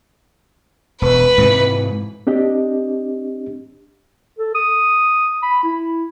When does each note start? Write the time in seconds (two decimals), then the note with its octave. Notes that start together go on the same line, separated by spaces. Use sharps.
1.02 E1 B4
1.38 G#2 C3 E3
2.27 C4 D4 G4 D#5
4.38 A4
4.55 D#6
5.43 B5
5.64 E4